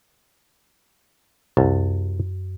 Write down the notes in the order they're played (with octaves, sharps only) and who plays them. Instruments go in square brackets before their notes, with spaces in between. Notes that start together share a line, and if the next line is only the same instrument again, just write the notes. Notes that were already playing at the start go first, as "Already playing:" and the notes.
[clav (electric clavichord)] C2 [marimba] F#2